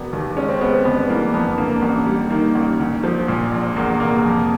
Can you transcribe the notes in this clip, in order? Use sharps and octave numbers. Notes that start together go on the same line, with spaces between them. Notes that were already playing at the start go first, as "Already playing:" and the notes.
Already playing: E1 B3
D#2
G#3 C#4
C4
G#3 B3
C4
G1 B3
E3 A#3
F2 B3
B3
D3 A#3
A#3
A1
G3
D#3 A#3
A1
D2
F3
A#2
A#1
E2 A#3
F1 A#3
F2